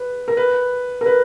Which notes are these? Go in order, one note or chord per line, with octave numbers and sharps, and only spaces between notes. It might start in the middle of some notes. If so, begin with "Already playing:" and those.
Already playing: B4
A#4
B4
A#4
B4